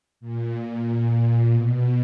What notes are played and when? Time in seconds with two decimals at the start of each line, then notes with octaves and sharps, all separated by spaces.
0.20 A#2
1.53 B2